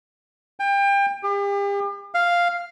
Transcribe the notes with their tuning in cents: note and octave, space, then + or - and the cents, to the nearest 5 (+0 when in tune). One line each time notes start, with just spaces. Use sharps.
G5 +30
G4 +40
F5 +0